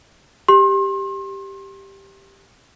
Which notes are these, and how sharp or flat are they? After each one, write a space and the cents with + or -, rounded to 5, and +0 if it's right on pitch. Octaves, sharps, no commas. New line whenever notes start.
G4 +0 C6 +35